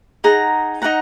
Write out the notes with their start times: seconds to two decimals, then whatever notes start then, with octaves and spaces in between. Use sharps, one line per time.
0.24 D#4 G#4 F#5 A#5
0.82 D#4 G#4 F#5 A#5